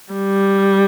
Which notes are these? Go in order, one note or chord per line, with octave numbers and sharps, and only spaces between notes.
G3